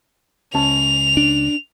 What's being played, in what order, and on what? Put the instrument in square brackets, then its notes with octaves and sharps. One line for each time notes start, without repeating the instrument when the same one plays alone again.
[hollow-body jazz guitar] C#2 C#4 A5 [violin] F7
[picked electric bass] D4